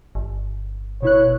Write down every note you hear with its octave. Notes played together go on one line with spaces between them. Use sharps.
G1
B2 E4 C#5 F#6